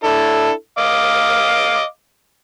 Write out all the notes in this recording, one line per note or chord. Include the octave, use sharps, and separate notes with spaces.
D4 E4 A4
D#5 F5 D6